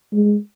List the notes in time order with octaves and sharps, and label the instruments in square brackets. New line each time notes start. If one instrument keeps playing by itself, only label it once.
[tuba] G#3